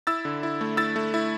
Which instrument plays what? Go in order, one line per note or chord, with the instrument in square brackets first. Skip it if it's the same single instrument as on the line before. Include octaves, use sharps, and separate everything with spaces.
[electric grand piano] E4 E6 A6
D3
E4
A3
E4 E6 A6
A3
E4